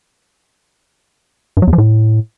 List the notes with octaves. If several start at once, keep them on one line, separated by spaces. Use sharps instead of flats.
G2
F#3
E2
F3
A2